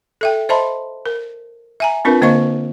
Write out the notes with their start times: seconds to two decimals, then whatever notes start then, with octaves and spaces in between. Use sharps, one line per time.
0.21 A4 E5 G5
0.49 C5 D#5 E5 A5 B5 C6
1.06 A#4
1.80 E5 G#5 A#5
2.05 C4 D4 F4 A#4 B4
2.21 D3 A#3 C5 D#5 F5 C#6